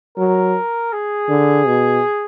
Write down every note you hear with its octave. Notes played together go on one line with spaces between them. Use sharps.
F#3 A#4
G#4
D3
B2